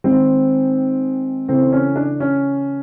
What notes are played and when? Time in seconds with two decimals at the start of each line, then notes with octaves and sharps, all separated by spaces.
0.04 D#3 G#3 C4
1.48 C#3 E3 A3 C4
1.72 C#4
1.96 D4
2.20 C#4